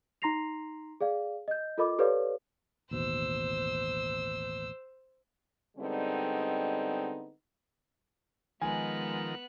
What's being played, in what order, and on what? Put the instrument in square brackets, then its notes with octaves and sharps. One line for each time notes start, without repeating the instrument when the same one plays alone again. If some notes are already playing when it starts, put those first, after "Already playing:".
[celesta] D#4 A#5 C6 A#6 C7 F7
G#4 D5 F5
D#5 G6
F4 A4 A#4 D#5 B5 D6
G4 A4 B4 C#5 D5 F5
[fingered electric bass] A1 D#2 B2 [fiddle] C5 E6
[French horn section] D3 G3 G#3 B3 C4 D#4
[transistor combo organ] D#3 F3 A#4 [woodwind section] G#3 [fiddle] B3 F#6 [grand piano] G#5